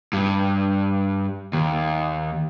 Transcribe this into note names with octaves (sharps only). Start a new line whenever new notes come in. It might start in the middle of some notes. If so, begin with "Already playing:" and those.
G2
D#2